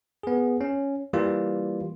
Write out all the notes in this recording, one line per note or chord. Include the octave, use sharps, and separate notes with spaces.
B3 G#4
C#4
E3 G3 A#3 F4